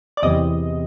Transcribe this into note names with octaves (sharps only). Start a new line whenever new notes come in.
D5
E2 C3 E3 D#5